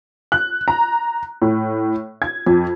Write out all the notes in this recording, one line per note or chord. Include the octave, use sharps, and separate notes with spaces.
F#6
A#5
A2
G#6
F2